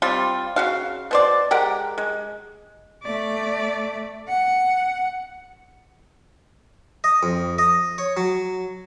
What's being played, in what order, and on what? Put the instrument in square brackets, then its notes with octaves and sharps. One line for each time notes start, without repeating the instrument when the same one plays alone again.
[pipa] G3 C4 F4
C#3 F#4 F5
B2 C5 D5
G#3 G4 A#4 F#5
G#3
[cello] A3 D5
F#5
[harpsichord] D#5
F2
D#5
C#5
F#3